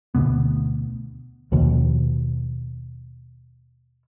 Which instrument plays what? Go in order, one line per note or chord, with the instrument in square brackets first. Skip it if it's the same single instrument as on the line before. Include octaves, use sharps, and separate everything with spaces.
[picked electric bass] D2 B2 B3
[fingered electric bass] D#2 B2 F3